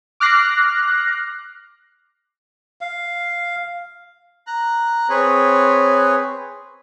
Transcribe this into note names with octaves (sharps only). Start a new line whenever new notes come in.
D6 F6 F#6 A#6 C7
F5
A#5 F#6
C4 G#4 B4 C#5